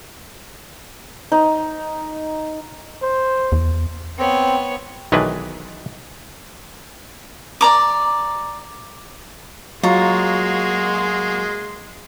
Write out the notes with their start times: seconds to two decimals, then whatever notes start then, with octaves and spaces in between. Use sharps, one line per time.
1.32 D#4
3.03 C5
3.52 E2
4.18 B3 C4 C#5
5.12 B1 D#3 E3 G#3 D4 B4
7.61 D5 A#5 D6
9.83 F#3 G#3 A#3 F4 F#4 C#5 A#5 C6